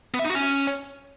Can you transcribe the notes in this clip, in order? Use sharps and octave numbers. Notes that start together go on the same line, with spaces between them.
B3
E5
D#4
F#4
C#4